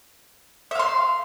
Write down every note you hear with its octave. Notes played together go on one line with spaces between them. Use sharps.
E5 F5 C6